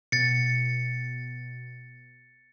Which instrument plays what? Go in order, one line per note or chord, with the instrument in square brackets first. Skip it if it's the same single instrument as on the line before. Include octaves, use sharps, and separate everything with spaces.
[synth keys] B2 [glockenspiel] A6 C#7